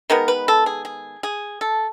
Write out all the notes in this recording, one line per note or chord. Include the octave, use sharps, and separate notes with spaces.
D#3 G#3 B3 A#4
B4
A4
G#4
G#4
G#4
A4